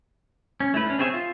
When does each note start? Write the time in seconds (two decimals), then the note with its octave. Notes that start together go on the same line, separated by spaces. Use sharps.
0.60 C#4
0.74 A3 E4 B4
0.87 C#4 D4
0.99 C4 G#4 C#5 E5
1.14 F4